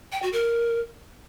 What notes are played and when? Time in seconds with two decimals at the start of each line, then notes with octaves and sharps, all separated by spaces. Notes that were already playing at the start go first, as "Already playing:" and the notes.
0.12 G5
0.22 F#4
0.33 A#4